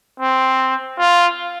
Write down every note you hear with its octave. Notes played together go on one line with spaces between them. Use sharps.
C4
F4